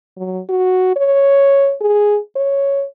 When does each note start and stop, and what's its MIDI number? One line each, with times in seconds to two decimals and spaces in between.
0.17 0.40 54
0.49 0.93 66
0.96 1.74 73
1.81 2.19 68
2.36 2.84 73